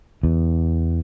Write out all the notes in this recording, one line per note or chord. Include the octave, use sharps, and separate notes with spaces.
E2